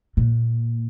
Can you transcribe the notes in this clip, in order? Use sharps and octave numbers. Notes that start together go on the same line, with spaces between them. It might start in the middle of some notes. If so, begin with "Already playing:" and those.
A#2